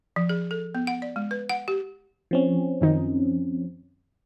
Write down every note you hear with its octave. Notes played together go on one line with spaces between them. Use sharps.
F3
G#4
A4
B3
F#5
D5
G#3
B4
F#5
G4
F3 C4 C#4
F#2 D#3 D#4